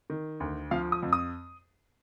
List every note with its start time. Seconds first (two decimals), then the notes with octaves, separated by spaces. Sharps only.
0.10 D#3
0.40 D2
0.71 F3 F5
0.92 D#6
1.03 F2
1.13 D#6